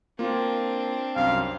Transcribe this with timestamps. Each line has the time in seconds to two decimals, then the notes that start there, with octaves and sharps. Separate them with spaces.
0.19 A#3 C4 D4 F4
1.16 C2 F#2 F5